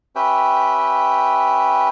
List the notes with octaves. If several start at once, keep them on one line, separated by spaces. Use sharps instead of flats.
C#4 G4 B4 E5 G5